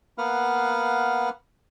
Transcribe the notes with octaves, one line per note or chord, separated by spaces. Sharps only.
A#3 B3 B4 F5 F#5 F6